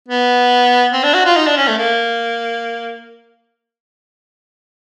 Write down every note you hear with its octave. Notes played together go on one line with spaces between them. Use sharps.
B3
C4
D4
F#4
F4
D#4
D4
C#4
A3
A#3